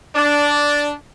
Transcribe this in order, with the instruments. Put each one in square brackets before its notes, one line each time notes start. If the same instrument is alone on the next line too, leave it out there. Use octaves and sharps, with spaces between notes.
[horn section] D4